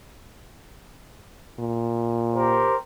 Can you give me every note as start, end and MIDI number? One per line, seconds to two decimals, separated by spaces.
1.59 2.71 46
2.34 2.75 67
2.34 2.75 70
2.34 2.75 72